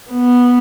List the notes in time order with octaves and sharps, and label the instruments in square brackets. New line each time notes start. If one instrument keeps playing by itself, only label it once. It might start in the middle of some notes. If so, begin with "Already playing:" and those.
[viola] B3